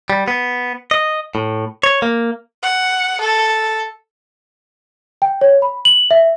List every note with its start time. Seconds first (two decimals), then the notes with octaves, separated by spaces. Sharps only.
0.10 G3
0.28 B3
0.91 D#5
1.35 A2
1.83 C#5
2.02 A#3
2.63 F#5
3.21 A4
5.22 G5
5.41 C#5
5.62 B5
5.85 F#7
6.11 E5